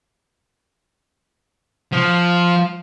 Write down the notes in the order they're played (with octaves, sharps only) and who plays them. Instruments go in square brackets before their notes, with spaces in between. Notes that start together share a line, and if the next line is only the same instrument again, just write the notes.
[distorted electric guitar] F3